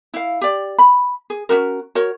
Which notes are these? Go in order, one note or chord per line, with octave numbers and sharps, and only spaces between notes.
E4 F5
G4 D5
B5
G#4
C#4 D4 F#4 A#4
F#4 A#4 C#5